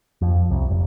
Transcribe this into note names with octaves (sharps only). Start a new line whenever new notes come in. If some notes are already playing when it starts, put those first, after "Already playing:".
F2
C2
F1